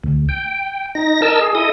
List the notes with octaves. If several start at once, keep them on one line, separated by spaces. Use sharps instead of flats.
D2
G5
D#4 A#6
A#4 D#5 A5 E6
G#4
E4 A4 D#5 D#6